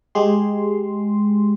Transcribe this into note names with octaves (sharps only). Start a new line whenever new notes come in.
G#3 G4 G#4 C6